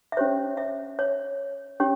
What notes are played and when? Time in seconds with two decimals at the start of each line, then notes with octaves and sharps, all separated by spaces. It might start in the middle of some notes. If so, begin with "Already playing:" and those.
0.12 E5
0.17 C#4 G4 C5 C#5
0.57 E5
0.99 C#5
1.80 C#4 G4 C#5